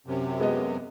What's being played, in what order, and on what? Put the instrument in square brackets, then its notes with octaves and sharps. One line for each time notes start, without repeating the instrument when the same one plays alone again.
[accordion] F#2 C3
[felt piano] G#3 B3 D#5